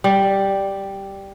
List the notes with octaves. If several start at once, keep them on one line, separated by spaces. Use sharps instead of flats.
G3